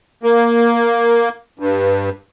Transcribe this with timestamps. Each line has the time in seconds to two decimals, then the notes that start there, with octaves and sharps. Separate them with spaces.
0.23 A#3
1.59 G2